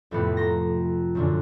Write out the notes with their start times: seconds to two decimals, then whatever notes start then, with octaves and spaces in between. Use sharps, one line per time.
0.11 F2 A2 C3 F3 B3
0.37 A#5 C6 A#6
1.15 F#2 A#2 D3